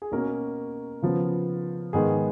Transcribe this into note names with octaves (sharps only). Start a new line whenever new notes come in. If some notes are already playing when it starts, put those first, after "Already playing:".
G#4
B2 A#3 C#4 A#4
C#3 F3 B3
G#2 D#3 G#3 B3 G#4